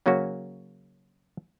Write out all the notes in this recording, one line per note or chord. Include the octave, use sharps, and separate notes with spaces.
C#3 F#3 A#3 C#4 F#4